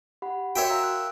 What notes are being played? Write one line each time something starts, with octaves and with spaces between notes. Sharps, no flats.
G4 F#5 B5
F#4 A#4 C#5 E5 G5 E6
F5 A#5 E6
F#6